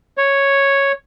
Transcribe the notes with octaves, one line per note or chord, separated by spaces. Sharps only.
C#5